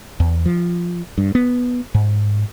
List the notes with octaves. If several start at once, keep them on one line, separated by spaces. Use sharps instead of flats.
E2
F3
G2
B3
G#2